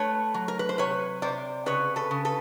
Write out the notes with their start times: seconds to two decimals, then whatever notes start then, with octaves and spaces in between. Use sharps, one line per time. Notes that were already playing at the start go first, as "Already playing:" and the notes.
Already playing: A3 B4 C#5
0.34 F#3
0.48 A#4
0.59 B4
0.69 C5
0.78 C3 B4 C#5
1.22 C3 C5 D5
1.66 C#3 B4 C#5
1.96 A4 B4
2.11 C#3
2.25 A4 B4